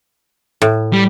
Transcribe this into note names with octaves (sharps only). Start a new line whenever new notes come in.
A2
G3